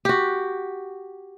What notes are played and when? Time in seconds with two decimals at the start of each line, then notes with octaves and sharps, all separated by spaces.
0.05 F#4 G4